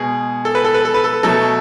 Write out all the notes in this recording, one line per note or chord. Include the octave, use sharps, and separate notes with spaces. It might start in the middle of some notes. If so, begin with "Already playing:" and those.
Already playing: B2 G#3 G#4
A4
B4
A4
B4
A4
B4
A4
B2 F#3 A3 A4